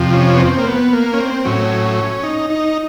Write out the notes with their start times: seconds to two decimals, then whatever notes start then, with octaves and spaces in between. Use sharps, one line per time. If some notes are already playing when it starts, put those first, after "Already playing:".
Already playing: F2 C3 F3
0.14 C#4
0.35 B3
0.40 C4
0.58 A#3
0.67 B3
0.93 A#3
1.14 C#4
1.19 C4
1.45 A2 F#3 C#4
2.23 D#4
2.50 D#4